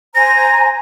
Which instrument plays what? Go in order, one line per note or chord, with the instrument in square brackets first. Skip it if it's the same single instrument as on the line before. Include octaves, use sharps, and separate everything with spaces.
[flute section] C5 G#5 A#5 [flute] A#6